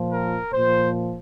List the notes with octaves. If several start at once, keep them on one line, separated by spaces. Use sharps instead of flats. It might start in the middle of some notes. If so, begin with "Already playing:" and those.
Already playing: A#2 F3
A#4
A#2 F3 C5